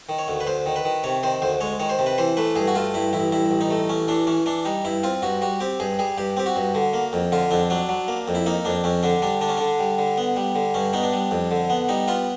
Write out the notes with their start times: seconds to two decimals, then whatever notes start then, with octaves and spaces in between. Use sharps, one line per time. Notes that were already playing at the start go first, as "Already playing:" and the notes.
0.09 D#3
0.19 C#5
0.28 D2
0.40 B4
0.47 D2 C5
0.66 D#3
0.76 B4
0.85 D#3
1.04 C3 C#5
1.23 D#3 C5
1.42 D2 C5
1.60 G#3 C#5
1.80 D#3 C#5
1.90 C5
1.99 C3
2.06 B4
2.18 E3 C5
2.37 A3 B4
2.56 G2 G#4
2.67 F#4
2.75 A3 F4
2.94 G2 E4
3.13 A1 E4
3.32 G2 E4
3.51 A1
3.61 D#4
3.71 A3
3.89 A1 C#4
4.08 E3 D4
4.27 E3 C#4
4.46 E3 D4
4.65 G3 D#4
4.85 G2 E4
5.03 C4 F4
5.22 G2 F#4
5.41 G3 F#4
5.60 C4 G4
5.80 G2 G#4
5.99 G3 G#4
6.18 G2 G4
6.37 C4 G4
6.46 F#4
6.56 G2
6.75 D3
6.94 A#3
7.13 F2
7.32 D3 F4
7.51 F2 D4
7.70 F#3 D4
7.89 F#3
8.08 A#3
8.28 F2
8.35 E4
8.46 A#3 D#4
8.65 F2 D4
8.84 F2 C#4
9.03 D3 D4
9.22 G3 D4
9.41 D3 D4
9.49 C#4
9.57 D3 D4
9.79 G3
9.98 D3
10.18 B3
10.36 G3
10.55 D3
10.74 G2 C#4
10.93 B3 D#4
11.03 D4
11.13 G3
11.31 F2
11.51 D3
11.70 B3
11.89 G3 D#4
12.08 B3 F4